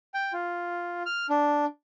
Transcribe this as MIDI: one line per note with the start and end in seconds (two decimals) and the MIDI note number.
0.14 0.33 79
0.33 1.03 65
1.06 1.26 89
1.30 1.65 62